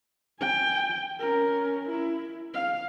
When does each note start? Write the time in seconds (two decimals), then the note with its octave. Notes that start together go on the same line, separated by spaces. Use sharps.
0.40 G5 G#5
1.19 C#4 A#4
1.89 E4
2.54 F5